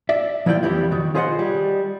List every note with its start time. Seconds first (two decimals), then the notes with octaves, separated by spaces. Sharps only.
0.09 D5 E5
0.46 F3 E4 F4 D5 G5
0.63 F2 E3 G3 E4
0.91 D#3 F#4
1.15 F4 G#4 C5 D#5 E5 F#5
1.39 G3